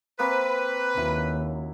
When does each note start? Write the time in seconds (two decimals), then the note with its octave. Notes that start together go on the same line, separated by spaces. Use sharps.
0.19 A#3 C4 B4
0.97 D#2 C#3 F#3 E4